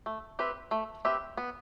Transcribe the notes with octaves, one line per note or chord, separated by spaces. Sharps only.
A3
C4 G4 B4 E5
A3
C4 G4 B4 E5
B3